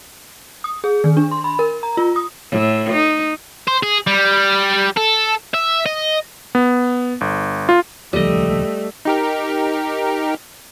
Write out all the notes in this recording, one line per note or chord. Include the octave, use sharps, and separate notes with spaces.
D#6
G#4
D#3
D4
C6
B5
A#4
A#5
F4
D#6
A2
D#4
C5
G#4
G3
A4
E5
D#5
B3
G1
F4
D#1 C#2 F3 G3 A3 D#5
D#4 G4 A#4